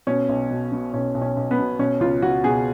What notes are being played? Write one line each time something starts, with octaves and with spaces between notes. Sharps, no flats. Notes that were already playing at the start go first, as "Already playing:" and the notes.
B2 C#4
B1
B2
B2
B1 C#4
B1
C#4
B1
B3
B2
B2 C#4
C#2 F4
C#2 F#4
B2 G#4